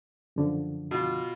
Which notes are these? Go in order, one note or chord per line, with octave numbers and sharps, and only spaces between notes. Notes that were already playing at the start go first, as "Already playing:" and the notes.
F#2 D3 F3
B2 F4